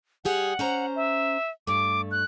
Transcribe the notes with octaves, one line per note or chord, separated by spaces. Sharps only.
G3 G4 G#4 F#5
C#4 C5 A#5
E5
G2 A3 D6
F#6